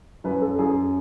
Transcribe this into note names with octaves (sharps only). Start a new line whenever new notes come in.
F#2 B4
A4
F#2 G#4